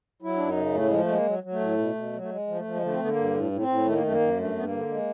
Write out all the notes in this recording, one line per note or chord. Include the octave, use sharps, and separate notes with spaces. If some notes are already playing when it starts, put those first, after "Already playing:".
F#3 E4
F#2 D4
D#4
C#3
A2 A3
F3 G#3
A3
G#3 A#3
F#3
F#3
A3
A2
B2
B2
F#3
A3
G#3
F3
A3
F3
G#3
D3 A3
C4
D3 B3
A#3
G2
A2
A2
C4
A2
D#3 A3
A#3
F#2 A3
A#3
F#2
G2 A3
G2 B3
A#3
D3
G#3